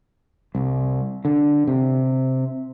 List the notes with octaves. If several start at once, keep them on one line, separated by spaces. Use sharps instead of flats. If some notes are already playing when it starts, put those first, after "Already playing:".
C2
D3
C3